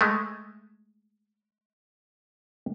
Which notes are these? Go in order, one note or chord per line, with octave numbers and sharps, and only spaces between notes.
G#3 A3